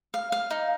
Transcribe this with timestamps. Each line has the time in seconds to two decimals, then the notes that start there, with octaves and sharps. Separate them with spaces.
0.14 F5
0.32 F5
0.51 D#4